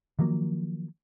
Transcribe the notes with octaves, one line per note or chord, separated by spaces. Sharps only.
D#3 F3 F#3 A#3